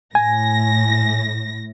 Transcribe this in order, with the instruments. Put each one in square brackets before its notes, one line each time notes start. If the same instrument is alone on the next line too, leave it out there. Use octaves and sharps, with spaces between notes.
[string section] A2 A#6 [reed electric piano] G#5